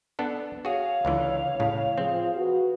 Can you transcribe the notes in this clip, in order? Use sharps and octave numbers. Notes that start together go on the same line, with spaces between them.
B3 D4 A4
F#4 G#4 C#5 F5
C#2 D3 E3
A2 C#3
F3 C4 G#4
F#4 B4